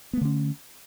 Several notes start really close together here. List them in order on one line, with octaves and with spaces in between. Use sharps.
B3 A3 D3 C#4